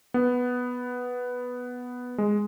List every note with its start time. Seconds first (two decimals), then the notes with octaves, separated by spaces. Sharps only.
0.14 B3
2.18 G#3